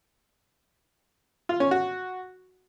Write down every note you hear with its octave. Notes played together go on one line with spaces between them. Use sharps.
F4
C#4
F#4